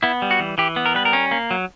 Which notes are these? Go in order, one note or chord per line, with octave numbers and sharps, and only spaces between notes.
B3 E4
G3
F#4
E3
E3 G4
B3
A#4
G3 B4
A#4
C#4
A#3
F#3